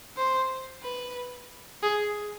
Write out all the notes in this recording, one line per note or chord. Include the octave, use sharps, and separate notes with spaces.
C5
B4
G#4